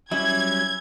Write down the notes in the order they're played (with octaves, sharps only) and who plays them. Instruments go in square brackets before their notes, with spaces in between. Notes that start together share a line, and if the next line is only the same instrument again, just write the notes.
[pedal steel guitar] F#3 G3 C#4 [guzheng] E4 [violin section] G#6